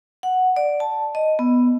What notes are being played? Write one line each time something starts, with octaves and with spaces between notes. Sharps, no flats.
F#5
D5
A5
D#5
B3